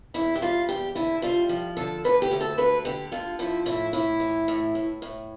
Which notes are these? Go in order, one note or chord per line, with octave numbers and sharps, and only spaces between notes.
E2 E4
G4
G3 F4
E2 G4
D3 E4
G3 F4
F3
D3 A4
D2 B4
G4
D2
A4
D3 B4
D3 G4
D3 F4
F3 E4
A2 E4
A2 E4
E3
A2
A2
A2